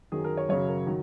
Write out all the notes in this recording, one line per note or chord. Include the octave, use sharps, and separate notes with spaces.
F#2 D#3 F#3 G#4
A#4
C#5
F#2 C#3 F#3 C#5
A#4
D#3 F#3